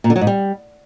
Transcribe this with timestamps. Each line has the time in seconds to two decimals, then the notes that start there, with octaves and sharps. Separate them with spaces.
0.04 A#2
0.10 D3
0.16 F#3
0.21 G#2
0.27 G3